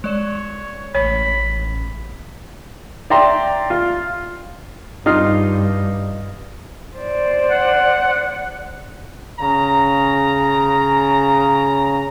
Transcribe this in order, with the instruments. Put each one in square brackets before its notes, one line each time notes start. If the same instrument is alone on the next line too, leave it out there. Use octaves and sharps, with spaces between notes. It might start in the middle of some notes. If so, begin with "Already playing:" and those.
[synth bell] G#3 D5 E7 [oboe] C#5
[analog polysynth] A1 [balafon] C#5 [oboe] B5
[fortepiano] D5 E5 G5 A#5 C6
F4
[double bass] G2 [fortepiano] D#4 F4 F5
[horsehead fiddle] C5 D5
[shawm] F#5
[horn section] C#3 A#5